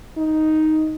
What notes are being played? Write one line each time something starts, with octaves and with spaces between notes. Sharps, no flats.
D#4